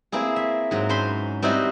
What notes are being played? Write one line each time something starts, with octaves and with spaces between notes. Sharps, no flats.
A#3 C4 E4 G#4
E5
G#2 F#3
C#4 C5 B5 C6
G3 C4 D#4 E4 F#4 D#5